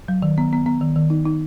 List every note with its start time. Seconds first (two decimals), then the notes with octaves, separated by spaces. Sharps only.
0.08 F#3
0.22 D#3
0.38 B3
0.53 B3
0.66 B3
0.81 D#3
0.96 D#3
1.10 D#4
1.25 D#4